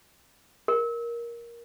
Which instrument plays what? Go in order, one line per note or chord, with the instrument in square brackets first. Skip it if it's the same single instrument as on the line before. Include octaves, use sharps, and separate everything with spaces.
[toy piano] A#4